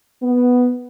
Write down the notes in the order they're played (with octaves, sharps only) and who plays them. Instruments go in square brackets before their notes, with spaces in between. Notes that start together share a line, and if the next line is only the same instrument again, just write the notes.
[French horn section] B3